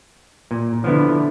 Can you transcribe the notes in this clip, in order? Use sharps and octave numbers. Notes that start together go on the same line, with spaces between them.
A#2
D3 F3 B3 E4